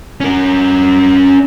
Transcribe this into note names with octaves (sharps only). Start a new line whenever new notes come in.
C#4 A#4